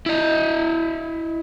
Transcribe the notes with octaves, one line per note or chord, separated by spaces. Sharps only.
E4 D#5